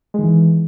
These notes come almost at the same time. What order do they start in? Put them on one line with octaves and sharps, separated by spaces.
G#3 D#3 E3